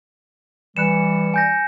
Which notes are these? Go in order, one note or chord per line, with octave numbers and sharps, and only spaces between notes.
E3 G3 F#6 C#7 E7
G#5 G6 A#6